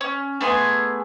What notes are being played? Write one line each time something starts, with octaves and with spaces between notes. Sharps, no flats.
C#4
A3 B3 G#4 C6